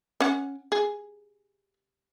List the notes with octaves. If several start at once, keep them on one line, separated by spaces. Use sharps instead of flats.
C#4 F#5
G#4